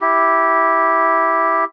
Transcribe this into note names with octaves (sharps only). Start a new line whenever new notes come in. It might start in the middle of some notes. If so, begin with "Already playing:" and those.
E4 G4